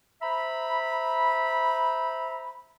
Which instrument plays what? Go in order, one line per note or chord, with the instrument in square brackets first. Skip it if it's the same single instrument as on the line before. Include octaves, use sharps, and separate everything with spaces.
[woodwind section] C5 E5 A#5 B5